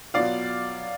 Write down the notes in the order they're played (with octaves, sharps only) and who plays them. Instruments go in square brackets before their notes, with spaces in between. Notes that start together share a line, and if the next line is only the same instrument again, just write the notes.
[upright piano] B2 F#3 B3 F4 D5 F5